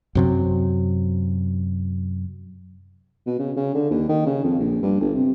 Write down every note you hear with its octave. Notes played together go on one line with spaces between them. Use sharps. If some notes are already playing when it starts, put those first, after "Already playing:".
F#2 C3 F#3
B2
C#3
C#3
D3
D#2
D#3
C#3
F2
A#1
G2
G1
C3